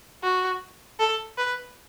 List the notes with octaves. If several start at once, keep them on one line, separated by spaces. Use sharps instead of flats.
F#4
A4
B4